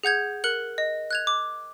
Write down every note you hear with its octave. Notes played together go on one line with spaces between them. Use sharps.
G#4 F#5 G6 G#6
A#4 F#6 C#7 F#7
D#5
F#6 G#6 F7
D6